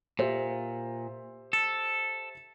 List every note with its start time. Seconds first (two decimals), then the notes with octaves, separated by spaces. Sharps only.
0.19 A#2 G4 C5 E5
1.53 A4